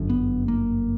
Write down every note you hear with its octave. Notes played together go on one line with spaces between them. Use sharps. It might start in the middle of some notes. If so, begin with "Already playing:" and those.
Already playing: G1 F#2 D3
B3
A#3